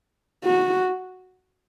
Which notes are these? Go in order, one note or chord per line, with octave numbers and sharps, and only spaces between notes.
F#4